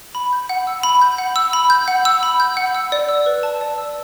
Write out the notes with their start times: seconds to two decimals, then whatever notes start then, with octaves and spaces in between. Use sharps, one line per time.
0.15 B5
0.33 G6
0.49 F#5
0.67 E6
0.83 B5
1.01 G6
1.18 F#5
1.36 E6
1.53 B5
1.70 G6
1.88 F#5
2.05 E6
2.23 B5
2.40 G6
2.57 F#5
2.75 E6
2.92 D5
3.09 E6
3.26 B4
3.43 A5
3.61 D5
3.78 E6